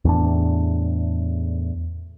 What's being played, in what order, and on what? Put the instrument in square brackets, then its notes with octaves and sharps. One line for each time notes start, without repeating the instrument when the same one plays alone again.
[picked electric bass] E2 A2 D4